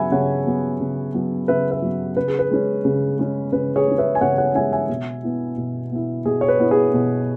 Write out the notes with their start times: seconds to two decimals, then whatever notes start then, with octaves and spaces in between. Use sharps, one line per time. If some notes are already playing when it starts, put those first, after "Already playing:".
Already playing: C#3 F#3 B3 E5 F#5 G#5 B5
0.12 C#3 C#5 F#5
0.46 F#3 B3
0.80 C#3
1.14 F#3 B3
1.48 C#3 B4 E5
1.71 B4 E5
1.82 F#3 B3
2.17 C#3 B4
2.28 G#4
2.39 B4
2.51 G#3 C#4
2.85 C#3
3.19 G#3 C#4
3.52 C#3 B4
3.76 G#4 C#5
3.87 G#3 C#4
3.98 B4 E5
4.15 G#5
4.21 C#3 C#5 F#5
4.38 C#5 F#5
4.55 G#3 C#4 E5 G#5
4.72 E5 G#5
4.89 B2
5.24 B3 E4
5.58 B2
5.92 B3 E4
6.25 B2 G#4
6.41 C#5
6.48 B4
6.60 B3 E4
6.71 G#4 C#5
6.94 B2